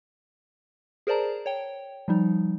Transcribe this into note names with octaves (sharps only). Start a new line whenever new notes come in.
G#4 A#4 C5 D5 A5 A#5
C#5 G5
F3 G3 D#4